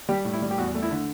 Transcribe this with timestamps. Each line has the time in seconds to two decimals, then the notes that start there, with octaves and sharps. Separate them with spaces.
0.09 G3 G4
0.25 A2
0.33 E4
0.42 G3
0.51 G4
0.58 E2 F#4
0.75 A3
0.82 E4
0.91 D3